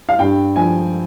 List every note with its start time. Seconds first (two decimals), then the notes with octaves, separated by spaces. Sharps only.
0.09 F5
0.19 G2 G5
0.56 F3 G#5